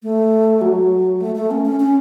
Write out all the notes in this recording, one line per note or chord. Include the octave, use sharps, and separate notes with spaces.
A3
F#3
A3
A3
C#4
C#4
C#4